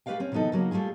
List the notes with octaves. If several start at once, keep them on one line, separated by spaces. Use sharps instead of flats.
A3 G4 B4 D5 F5 G5
C4 C#4
C3 E3 F#3 B3 D#4 A4
C#3 F#3 A#3 D#4
G3 A3 C#4 F4 G#4